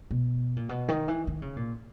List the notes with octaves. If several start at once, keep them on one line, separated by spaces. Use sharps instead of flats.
B2
A#2
B2
D#3
E3
D#3
C#3
A#2